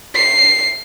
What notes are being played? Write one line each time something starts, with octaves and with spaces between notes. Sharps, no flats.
C7